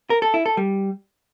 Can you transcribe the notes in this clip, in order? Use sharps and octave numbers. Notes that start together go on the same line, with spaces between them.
A#4
A4
E4
A4
G3